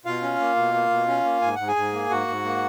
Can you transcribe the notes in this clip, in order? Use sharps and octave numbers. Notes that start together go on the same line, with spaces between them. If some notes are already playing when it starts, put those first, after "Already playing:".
B2 F4 F5
C#4
A#3
B2
A#3
B2
C#4
A#3
G#2 G#5
G#2 F#5
G#4 G#5
G#2
A#3
G#2 F#4 F#5
G#2
A#3